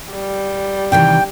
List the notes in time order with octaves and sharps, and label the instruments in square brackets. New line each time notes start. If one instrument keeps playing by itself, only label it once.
[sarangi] G3
[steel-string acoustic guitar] C3 D#3 E3 [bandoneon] G5